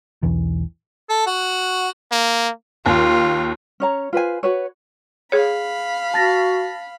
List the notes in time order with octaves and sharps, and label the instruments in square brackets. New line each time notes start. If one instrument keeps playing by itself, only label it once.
[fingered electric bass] B1 E2 E3
[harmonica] A4
F#4
[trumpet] A#3
[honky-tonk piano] D#2 [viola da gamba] F4
[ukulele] C#4 C#5 A#5
F4 B4 C5 G#5
F#4 B4 C#5
[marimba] G#4 C#5 [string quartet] F5 B5
[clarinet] F#4 [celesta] A5 A6 A#6